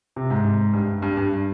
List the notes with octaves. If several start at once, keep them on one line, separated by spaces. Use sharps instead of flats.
C3
G#2
G2
G2
G2